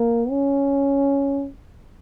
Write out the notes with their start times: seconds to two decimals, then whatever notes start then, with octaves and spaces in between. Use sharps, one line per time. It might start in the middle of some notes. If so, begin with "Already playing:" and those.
Already playing: A#3
0.30 C#4